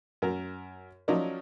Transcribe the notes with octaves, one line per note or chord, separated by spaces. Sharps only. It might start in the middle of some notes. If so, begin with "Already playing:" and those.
F#2 A#4
F3 F#3 C#4 D#4 A#4 D5